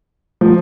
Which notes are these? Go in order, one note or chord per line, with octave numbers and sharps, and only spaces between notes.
F3